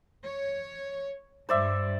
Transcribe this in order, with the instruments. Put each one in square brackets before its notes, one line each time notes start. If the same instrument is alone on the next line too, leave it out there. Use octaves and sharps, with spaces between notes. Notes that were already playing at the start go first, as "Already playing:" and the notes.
[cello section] C#5
[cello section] G2 [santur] C5 D5 E5